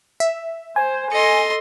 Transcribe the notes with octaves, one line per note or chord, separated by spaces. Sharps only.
E5
C5 G#5
A4 D#5 C6 A#6 C#7